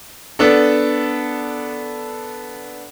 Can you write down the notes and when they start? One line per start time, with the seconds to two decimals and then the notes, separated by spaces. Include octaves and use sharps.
0.39 B3 D4 A4